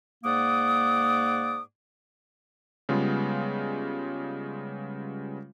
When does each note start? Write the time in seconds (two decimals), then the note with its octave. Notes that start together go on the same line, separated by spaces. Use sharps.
0.24 G#2 A#3 D5 F#5 D6 D#6
2.89 C#3 G3 G#3 B3 F4